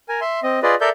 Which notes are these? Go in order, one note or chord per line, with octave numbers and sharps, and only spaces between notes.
A#4 G#5
E5 C6
C4 D#5
F4 G#4 B4 D5 D#5
A4 A#4 D5 E5 G6